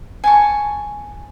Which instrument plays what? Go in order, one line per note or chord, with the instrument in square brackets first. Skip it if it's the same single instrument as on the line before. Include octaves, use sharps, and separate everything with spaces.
[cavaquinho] G#5 A5 C#6